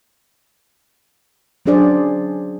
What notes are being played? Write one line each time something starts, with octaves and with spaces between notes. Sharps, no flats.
F#3 C#4 D4 G#4 C5 D5